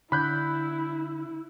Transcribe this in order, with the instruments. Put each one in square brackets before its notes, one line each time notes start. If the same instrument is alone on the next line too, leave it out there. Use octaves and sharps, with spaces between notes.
[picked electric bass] D3 [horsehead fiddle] E4 [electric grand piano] B5 F#6 G6